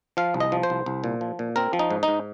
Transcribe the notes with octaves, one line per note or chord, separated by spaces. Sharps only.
F3 F5
C2
D#5
F3
C5
C2
C2
A#2
F3
A#2
C4 A#4
F3
D#4
G#2
D#4
G#2